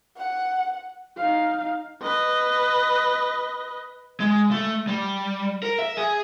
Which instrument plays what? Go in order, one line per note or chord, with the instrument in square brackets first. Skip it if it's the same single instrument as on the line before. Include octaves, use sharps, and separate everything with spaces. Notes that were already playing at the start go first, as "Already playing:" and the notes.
[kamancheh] F#5
[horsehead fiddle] D#4 F5
[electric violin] B4 D#5
[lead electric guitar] G#3
A3
G3
A#4
E5
G#4